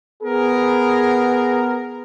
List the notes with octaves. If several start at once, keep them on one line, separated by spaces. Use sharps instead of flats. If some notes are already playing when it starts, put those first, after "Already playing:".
B3 G#4 A#4